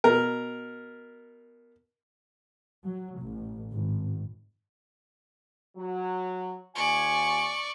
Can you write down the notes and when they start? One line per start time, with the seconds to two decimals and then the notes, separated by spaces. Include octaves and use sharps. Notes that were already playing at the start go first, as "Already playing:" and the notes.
0.04 B2 A#4
2.83 F#3
3.19 A1
3.73 G#1
5.76 F#3
6.75 D#2 F4 D5 G#5 C#6